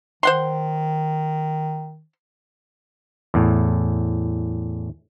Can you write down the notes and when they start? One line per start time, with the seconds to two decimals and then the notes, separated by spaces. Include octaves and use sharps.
0.23 D#3 C5 F#5 C6
3.34 E2 A2